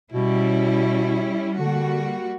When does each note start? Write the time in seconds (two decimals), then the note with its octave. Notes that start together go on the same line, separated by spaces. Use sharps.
0.12 B2 G3 C#4 E4
1.58 D3 G3 A#3 F#4